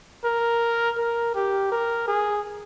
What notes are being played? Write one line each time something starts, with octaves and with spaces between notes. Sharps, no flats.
A#4
A#4
G4
A#4
G#4